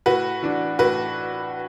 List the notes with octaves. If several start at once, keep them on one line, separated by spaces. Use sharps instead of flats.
A2 F#4 B4
E3 D4
A2 F#4 B4